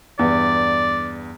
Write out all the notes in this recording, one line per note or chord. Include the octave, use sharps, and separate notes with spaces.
E2 G2 D5